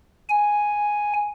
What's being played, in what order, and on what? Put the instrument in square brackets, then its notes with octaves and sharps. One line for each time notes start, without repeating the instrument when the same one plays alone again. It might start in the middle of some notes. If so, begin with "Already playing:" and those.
[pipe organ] G#5